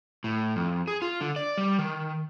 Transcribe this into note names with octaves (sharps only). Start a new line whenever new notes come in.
A2
F2
G#4
F4
D3
D5
G3
D#3